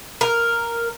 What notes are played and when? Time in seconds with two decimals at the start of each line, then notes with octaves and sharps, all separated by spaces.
0.21 A#4